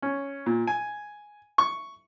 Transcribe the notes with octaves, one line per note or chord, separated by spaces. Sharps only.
C#4
A#2
G#5
C#6